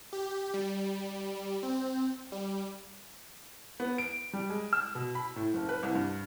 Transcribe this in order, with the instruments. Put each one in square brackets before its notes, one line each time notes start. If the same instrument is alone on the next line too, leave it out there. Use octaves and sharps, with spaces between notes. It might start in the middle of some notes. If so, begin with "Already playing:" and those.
[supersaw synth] G4
G3
C4
G3
[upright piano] B3
D7
G3
G#3
E6
B2
B5
A2
F#1
B4
C2
G2